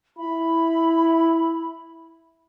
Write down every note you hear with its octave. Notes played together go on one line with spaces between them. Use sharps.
E4 B5